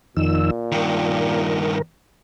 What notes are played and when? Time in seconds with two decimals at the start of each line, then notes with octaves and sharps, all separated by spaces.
0.17 F2 A#2 D#3 E6
0.72 G2 D#3 A#4